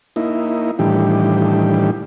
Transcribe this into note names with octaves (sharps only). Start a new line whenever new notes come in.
A#3 D#4 E4
A2 D#3 E3 G3 D4 G4